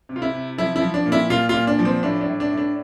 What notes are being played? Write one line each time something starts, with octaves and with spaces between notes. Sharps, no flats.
C3
F4
E4
C3
F3 E4
E4
F3
D4
A#2
E4
A#2 F4
A#2 F4
D4
F3
C4
A2 D4
D4
A2
D4
A2
D4